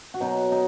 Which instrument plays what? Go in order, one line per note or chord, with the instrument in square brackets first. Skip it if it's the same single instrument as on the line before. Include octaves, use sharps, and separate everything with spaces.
[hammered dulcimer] F#4
B2 F#3 D#4
D#4